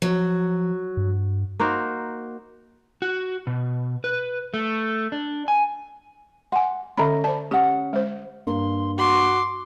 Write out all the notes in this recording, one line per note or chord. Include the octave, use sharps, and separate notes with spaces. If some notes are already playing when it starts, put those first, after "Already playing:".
F3 F#3
G2
A#3 D#4 F#4 C5
F#4
B2
B4
A3
D4
G#5
F#5 G#5 C6
D3 C#4 D#5 E5 A#5 B5
C5 D5 A5
C#4 G4 F#5
G#3 C5
G2 A#3 C6
F#4 C6 D6